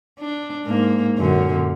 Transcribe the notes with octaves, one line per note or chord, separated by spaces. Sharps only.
D4
G#2 A#3
F#2 A#2 D3